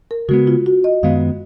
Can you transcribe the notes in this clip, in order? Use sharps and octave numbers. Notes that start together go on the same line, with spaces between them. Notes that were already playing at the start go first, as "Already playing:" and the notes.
A#4
C#3 G#3 B3 F#4
F4
F#4
D#5
F#2 D#3 G#3 B3 F5